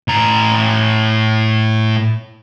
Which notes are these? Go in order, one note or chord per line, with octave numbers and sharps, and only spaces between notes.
A2 A#5